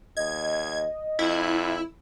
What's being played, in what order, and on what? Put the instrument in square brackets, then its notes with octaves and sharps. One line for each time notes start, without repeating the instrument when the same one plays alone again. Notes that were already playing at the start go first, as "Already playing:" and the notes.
[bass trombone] D#2 [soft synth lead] D#5 [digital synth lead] G#6
[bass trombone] F2 [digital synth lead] E4